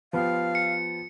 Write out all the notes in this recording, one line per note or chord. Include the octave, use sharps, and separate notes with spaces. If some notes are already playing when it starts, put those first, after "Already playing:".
F3 B3 G4 F5
C#7